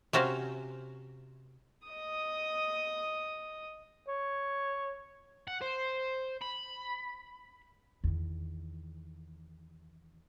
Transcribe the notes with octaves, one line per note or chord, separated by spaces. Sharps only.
C3 C#4 F#4 C5 F5
D#5 D#6
C#5
F#5
C5
B5
E2 D#3